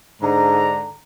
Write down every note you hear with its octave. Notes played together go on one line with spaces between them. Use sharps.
G#2 D3 D4 A#5